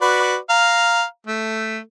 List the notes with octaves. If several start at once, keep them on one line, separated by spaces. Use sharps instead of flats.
F#4 B4 D5
F5 A#5
A3